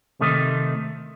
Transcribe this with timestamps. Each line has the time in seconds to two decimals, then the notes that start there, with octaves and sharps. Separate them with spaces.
0.20 C3 D#3 A3 D#4